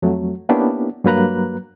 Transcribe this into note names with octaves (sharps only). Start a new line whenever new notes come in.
F2 F#3 A3
A#3 B3 C#4 D4 E4 G4
G2 F#3 A#3 B4 A#5 F#6